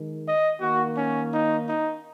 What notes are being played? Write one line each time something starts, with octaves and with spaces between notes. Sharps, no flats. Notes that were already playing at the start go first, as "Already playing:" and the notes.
Already playing: D#3 G#3
D#5
D#3 A#3 F#4
C#4
D#4
D#4